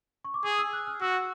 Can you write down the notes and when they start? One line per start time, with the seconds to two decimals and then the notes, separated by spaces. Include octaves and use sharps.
0.25 C#6
0.34 D6
0.44 G#4 D#6
0.58 E6
0.73 F#6
0.87 F6
1.01 F#4 E6